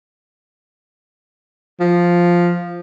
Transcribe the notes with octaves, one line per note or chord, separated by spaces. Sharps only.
F3